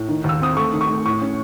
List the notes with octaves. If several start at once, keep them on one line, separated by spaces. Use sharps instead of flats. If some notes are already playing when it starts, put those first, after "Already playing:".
Already playing: A2
D#3
D#2 E6
C4 D#6
A3 C#6
D#3
C#6
A3
A2 C#6
C#4